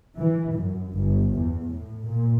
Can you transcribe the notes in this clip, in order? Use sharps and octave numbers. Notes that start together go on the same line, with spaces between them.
E3
F#2
G1
E2
A2
A#2